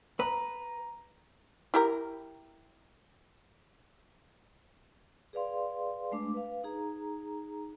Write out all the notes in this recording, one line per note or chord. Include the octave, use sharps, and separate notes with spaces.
B4 A#5
E4 G4 A#4
G#4 B4 D5 F5 C6
G#3 A3 D4 D6
B4 F5
D#4 G#4 A#5